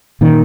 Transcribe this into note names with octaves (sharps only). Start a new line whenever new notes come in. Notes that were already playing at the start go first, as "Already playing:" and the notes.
A#2 D#3